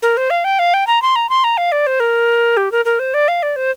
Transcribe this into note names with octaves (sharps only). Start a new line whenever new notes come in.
A#4
C5
F5
G5
F5
G5
A#5
C6
A#5
C6
A#5
F5
D5
C5
A#4
G4
A#4
A#4
C5
D5
F5
D5
C5